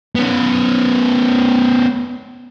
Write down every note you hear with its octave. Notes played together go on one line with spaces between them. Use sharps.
B3 C#4